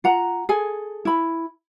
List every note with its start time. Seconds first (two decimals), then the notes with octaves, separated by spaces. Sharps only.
0.04 F4 F#5 A#5
0.49 G#4 A4 G#5
1.05 E4 B5